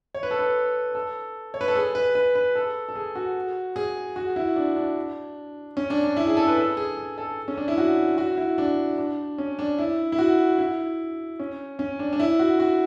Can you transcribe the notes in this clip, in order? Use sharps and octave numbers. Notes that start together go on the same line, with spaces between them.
C#5
B4
A4
B4
A4
C#5
B4
A4
G#4
B4
B4
B4
A4
A4
G#4
F#4
G#4
F#4
E4
D4
D4
C#4
D4
D4
E4
G#4
A4
B4
A4
G#4
G#4
A4
C#4
D4
E4
F#4
F#4
E4
D4
D4
C#4
D4
E4
E4
F#4
E4
C#4
C#4
D4
D4
E4
F#4
F#4